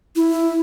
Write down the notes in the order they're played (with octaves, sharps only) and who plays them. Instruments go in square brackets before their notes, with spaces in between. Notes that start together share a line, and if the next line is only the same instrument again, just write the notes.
[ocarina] E4